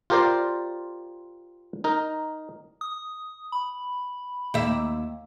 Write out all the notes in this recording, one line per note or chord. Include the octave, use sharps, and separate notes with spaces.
F4 G4 A#4 C5 D5 F5
D#4 A#4
D#6
B5
D#2 E5